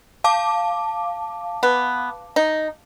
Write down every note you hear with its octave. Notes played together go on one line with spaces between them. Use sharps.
F5 A5 D6
B3
D#4